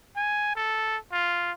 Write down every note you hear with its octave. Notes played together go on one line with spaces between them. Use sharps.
G#5
A4
F4